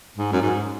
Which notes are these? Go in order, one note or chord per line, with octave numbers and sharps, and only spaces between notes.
G#2
F#2
G#2